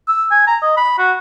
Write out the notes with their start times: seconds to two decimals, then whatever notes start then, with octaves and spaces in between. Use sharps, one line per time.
0.08 E6
0.31 G#5
0.47 A#5
0.62 D#5
0.77 B5
0.98 F#4